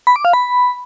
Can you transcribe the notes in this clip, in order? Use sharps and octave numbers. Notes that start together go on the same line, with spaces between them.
B5
D6
F5
B5